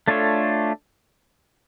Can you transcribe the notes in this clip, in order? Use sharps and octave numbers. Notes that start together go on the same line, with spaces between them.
A3 D4 F4 A4 C#5